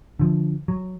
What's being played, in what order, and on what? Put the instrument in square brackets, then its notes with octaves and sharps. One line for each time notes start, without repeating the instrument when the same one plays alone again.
[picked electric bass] D3 F3
F#3